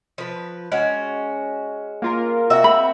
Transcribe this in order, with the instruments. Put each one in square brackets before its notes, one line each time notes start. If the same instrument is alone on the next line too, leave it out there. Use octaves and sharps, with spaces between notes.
[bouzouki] F3 B4
G#3 C#4 F#4
[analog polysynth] A#3 F4 A#4
[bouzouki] C4 F#4 E5
[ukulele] B5